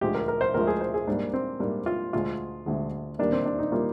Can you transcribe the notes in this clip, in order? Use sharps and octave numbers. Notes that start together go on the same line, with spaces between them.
D2 D3 F3 G#3 G4
A#4
A#4
C5
D2 D3 F3 G#3 A#4
G#4
C5
G#4
G#2 G3 A#3 D4
C4
G#2 G3 A#3 D4
F4
D2 D3 G#3 F4
D2 D3 G#3
D#2 D#3 G3 A#3 D4
C4
D4
D#4
D#3 G3 A#3 F4